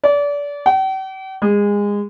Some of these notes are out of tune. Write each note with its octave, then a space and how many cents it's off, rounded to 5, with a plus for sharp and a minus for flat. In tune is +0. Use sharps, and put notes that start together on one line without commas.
D5 -30
G5 -45
G#3 -25